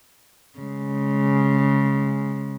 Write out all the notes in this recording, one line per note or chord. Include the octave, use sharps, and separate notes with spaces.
C#3 G#3